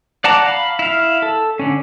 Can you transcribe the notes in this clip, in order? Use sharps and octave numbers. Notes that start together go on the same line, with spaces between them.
D5 F#5 A5 A#5 D6
F5 B5
E4 F5
A4
D3 C#4